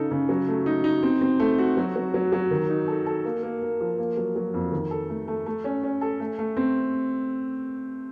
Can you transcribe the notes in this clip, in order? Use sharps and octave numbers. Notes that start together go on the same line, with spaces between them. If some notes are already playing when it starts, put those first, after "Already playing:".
Already playing: C#3 D#4 F4 A4
C#3
F#3
A3
D#4
D#4
C4
C4
A3
F#4
F#3
F#3
F#3
F#3
D#3
D#4
A4
A4
A#3
A#3
A#3
F3
A#3
F#3
F#3
F2
D#3
A4
A3
A3
A3
C#4
C#4
A4
A3
A3
C4